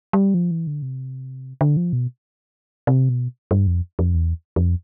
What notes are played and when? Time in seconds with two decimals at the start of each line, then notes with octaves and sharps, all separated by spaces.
0.13 G3
0.34 F3
0.51 E3
0.67 D3
0.82 C3
1.61 D3
1.77 F3
1.93 B2
2.87 C3
3.09 B2
3.51 G2
3.67 F2
3.99 F2
4.15 E2
4.56 F2